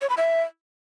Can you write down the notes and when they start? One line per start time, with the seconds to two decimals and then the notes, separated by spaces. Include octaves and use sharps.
0.01 C#5
0.09 B5
0.17 E5